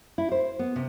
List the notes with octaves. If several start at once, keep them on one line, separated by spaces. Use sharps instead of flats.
E4
C5
B3
C3